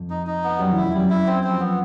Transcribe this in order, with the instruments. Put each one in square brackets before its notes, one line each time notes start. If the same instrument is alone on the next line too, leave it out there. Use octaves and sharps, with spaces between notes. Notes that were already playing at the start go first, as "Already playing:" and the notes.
Already playing: [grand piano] F2 F3
[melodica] D#4
D#4
B3
[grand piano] F#2 F#3 [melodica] G3
[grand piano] E2 E3 [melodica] E4
[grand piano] E2 E3
[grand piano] F#2 F#3 [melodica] G3
[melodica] E4
C4
C4
[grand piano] F3
[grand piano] F#3 [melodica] B3